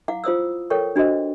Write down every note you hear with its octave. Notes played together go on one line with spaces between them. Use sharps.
E4 F5 F#5 D6
F4 C5 D#6 E6
A4 A#4 C#5 G5 C#6
D4 F#4 C5 D#5